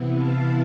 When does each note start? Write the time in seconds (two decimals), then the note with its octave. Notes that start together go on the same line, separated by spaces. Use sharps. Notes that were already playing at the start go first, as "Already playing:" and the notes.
Already playing: C3 E3 B3 E4
0.17 F5 A5